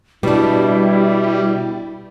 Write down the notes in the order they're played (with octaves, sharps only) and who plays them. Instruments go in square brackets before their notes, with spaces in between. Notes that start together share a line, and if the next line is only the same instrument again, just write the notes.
[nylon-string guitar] B2 D4 [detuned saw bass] G3 [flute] E4